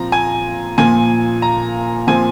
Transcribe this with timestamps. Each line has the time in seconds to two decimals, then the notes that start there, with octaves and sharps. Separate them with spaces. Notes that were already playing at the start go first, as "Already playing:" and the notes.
Already playing: A#2 F3 C4 A#5
0.12 G#5
0.78 A#2 F3 A#3 G#5
1.42 A#5
2.07 A#2 F3 C4 G#5